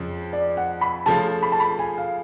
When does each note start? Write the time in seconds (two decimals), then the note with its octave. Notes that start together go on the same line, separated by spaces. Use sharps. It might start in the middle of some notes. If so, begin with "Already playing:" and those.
Already playing: F2 C#3 F3
0.33 D5
0.57 F#5
0.81 B5
1.06 C#3 F3 A3 F4 A5
1.43 B5
1.52 A5
1.60 B5
1.79 G#5
1.98 F5